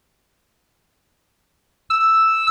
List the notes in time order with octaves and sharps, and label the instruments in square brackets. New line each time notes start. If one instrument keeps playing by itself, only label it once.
[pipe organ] E6